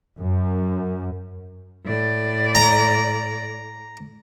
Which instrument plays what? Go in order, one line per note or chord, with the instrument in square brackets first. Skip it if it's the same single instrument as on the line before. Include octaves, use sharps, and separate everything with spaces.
[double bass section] F#2
[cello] A2 D5
[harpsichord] A#5